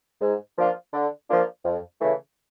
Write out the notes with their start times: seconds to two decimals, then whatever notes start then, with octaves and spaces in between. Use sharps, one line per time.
0.21 G#2
0.57 F3 A#3 D4 F4
0.93 D3
1.29 F3 A#3 D4 F4
1.64 F2
2.00 C#3 E3 A3